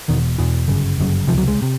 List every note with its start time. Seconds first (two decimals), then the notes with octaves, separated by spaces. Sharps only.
0.08 E1 E2 B2 D#3
0.39 E1 E2 B2 E3
0.68 G1 F#2 C#3
0.98 G1 F#2 C#3
1.28 C3 F3
1.32 C#2
1.38 F#3
1.48 G#3
1.62 C3